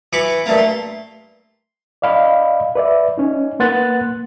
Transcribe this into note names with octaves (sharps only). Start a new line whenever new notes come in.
E3 B5 C#6 D6
G2 A3 A#3
C6
D5 D#5 F5 B5
B4 D5 E5
C#4 D#4
A#3 B4 F#5 C6 F#6 A6